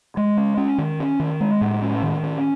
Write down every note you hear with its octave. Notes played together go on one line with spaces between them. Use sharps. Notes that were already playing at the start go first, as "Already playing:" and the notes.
G#3
C#4
C#4
D#3
C#4
D#3
G#3
A2
C#4
D#3
C#4